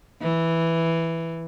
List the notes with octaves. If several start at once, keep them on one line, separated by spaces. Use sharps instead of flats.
E3